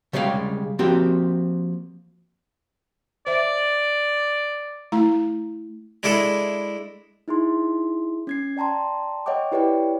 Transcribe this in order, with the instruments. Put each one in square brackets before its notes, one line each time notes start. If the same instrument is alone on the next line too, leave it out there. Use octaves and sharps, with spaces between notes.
[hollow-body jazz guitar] C#3 G3 G#3 G4 F5
F3 A#3 C4 F#4 G4
[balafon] C5 E5 [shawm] D5
[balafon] A3 E4 A#5
[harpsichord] G#3 D4 E4 G#4 A4
[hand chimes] D#4 E4 G#4 C6
C#4 G#6 C7
D5 G5 A5 A#5 C6
C#5 D#5 F#5 G5 D6
E4 G4 B4 C#5 D5 G5